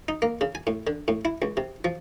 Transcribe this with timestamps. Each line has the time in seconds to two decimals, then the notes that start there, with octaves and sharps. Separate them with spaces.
0.08 D#4
0.22 A#3
0.41 C#3
0.55 G#5
0.67 A2
0.87 D3
1.08 A2
1.25 E4
1.42 C#2
1.57 C3
1.85 F3